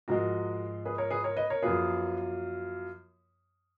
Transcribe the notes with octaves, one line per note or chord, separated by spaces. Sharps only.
G#2 F3 G#3 F#4 A#4
G#4 B4
A#4 C#5
G#4 B4
A#4 C#5
B4 D#5
A#4 C#5
F#2 F3 A#3 F4 G#4 B4